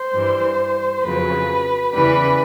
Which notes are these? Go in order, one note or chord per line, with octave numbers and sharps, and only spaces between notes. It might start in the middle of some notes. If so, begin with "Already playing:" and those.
Already playing: C5
G2 E3 G3
F2 C#3 F#3 B4
E2 C#3 E3 G3 B4